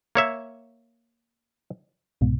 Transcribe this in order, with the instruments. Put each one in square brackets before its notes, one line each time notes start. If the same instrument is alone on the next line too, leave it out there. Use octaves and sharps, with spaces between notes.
[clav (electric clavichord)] A#3 C#5 E5
[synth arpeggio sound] C2 G#2 B2